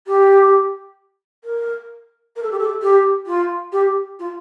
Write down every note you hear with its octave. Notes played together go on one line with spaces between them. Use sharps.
G4
A#4
A#4
A4
G4
A4
G4
F4
G4
F4